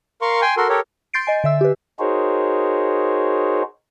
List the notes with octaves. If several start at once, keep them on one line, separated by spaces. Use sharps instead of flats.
A#4 F5 C6 C#6
G5 G#5 C6
F#4 A4 A#4 C6
G4 A4 A#4 C#5
C6 G6 A6 C7 D7
D#5 G#5
D3 E5 E6
G4 B4
D#4 F#4 G#4 A#4 C5 C#5